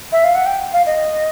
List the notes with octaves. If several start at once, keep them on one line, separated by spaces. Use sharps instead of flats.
E5
F5
F#5
G5
F5
D#5